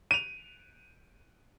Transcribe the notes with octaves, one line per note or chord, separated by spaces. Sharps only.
D#7 F7